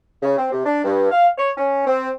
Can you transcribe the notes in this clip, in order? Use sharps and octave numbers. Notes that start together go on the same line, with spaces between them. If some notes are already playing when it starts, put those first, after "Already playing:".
C#3
C4
C3
D4
G2
F5
C#5
C#4
C4